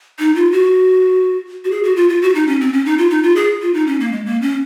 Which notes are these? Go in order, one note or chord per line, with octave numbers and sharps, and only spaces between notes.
D#4
F4
F#4
F#4
G#4
F#4
F4
F4
F#4
D#4
C#4
C4
C#4
D#4
F4
D#4
F4
G#4
F4
D#4
C#4
A#3
G#3
A#3
C#4